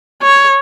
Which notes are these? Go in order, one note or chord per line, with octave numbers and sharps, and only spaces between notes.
C#5